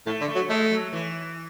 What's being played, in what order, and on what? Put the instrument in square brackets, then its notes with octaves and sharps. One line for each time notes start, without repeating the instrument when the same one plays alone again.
[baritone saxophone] A2 [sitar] A3
[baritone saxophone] D3
[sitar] A3
[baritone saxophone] F#3
[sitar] G#3 [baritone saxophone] A3
[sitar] F#3
E3